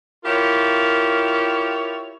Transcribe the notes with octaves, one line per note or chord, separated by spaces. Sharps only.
E4 F4 G4 A#4 C#5